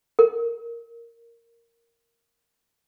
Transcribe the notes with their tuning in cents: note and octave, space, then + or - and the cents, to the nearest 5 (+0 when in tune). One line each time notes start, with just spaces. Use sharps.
A#4 -5